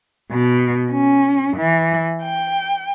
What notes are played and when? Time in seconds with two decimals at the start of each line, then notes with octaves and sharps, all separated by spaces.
0.31 B2
0.91 C#4
1.56 E3
2.22 G5